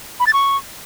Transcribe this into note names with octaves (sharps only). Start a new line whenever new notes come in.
B5
A6
C#6